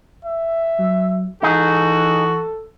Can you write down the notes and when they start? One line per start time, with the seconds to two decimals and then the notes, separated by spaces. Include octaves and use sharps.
0.25 E5
0.79 F#3
1.43 E3 D#4 F#4 G#4 A4